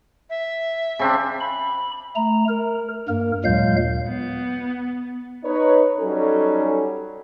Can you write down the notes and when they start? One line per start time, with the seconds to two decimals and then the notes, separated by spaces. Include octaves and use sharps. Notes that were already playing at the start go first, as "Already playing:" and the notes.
0.30 E5
0.99 C#3 C4 D4
1.40 B5
2.16 A3 A#5
2.48 A#4
3.09 G2 A#3 A#4
3.44 D#2 A#2 F#3 G#3 F5 G6
4.08 B3
5.45 D#4 B4 C#5
5.99 F#3 G3 C#4 D#4 A4